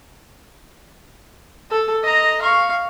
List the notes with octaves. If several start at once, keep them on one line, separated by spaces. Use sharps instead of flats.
A4
D#5 A#5
F5 C#6